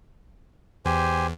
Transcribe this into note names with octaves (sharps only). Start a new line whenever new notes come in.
E2 G4 C5 G#5